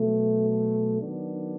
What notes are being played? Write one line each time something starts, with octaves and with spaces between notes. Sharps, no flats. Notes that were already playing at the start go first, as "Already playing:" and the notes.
Already playing: B2 F#3 A3
D#3 F#3 B3 D4